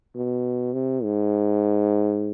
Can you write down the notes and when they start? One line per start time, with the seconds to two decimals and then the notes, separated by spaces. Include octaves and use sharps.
0.16 B2
0.73 C3
1.04 G#2